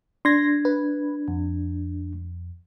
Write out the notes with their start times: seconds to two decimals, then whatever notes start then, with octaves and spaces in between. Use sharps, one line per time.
0.25 D4 C6 G#6 A#6
0.65 B4
1.28 F2